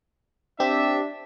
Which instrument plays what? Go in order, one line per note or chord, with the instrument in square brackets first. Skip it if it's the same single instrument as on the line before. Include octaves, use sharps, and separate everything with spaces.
[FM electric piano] C4 G4 [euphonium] D4 [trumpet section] E5